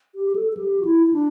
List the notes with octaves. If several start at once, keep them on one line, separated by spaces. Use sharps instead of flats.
G4
G4
A4
A4
G4
F#4
E4
E4
D4